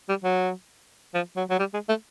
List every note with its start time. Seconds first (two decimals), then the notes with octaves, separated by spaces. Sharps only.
0.09 G3
0.24 F#3
1.14 F3
1.36 F#3
1.50 F#3
1.59 G3
1.73 G#3
1.89 A3